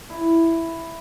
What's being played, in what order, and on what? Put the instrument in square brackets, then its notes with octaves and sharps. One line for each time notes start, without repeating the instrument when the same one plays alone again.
[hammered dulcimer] E4